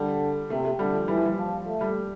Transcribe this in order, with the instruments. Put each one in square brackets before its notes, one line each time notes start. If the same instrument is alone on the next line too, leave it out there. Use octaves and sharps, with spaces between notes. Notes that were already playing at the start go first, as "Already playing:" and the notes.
Already playing: [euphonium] D3 [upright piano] G3
[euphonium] C3 [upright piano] A3
[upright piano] A3
[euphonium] D3 [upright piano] G3
[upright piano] F3
[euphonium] E3 [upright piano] G3
[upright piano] F3
G3
[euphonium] F3
A3
[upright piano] G3